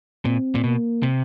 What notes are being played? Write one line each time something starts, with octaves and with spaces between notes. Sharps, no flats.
A#2 C4
A#2
B2 A#3
C3